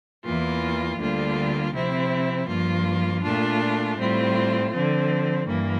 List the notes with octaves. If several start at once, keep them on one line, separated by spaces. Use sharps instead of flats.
E2 E3 A#3 F4
D2 D3 G3 A#3 F4
C3 F3 C4 E4
G2 F3 A#3 F4
A#2 A3 D4 F4
A2 G3 C4 F4
D3 F3 C4
G2 E3 A#3